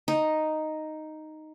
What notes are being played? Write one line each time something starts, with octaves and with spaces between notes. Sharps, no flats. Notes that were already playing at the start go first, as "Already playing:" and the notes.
D#4